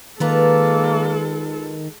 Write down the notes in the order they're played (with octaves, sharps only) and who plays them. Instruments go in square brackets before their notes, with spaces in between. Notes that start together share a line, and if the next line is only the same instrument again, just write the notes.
[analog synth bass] D#3 [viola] G#3 A4 [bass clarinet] A#3 [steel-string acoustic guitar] F4 B4 A#5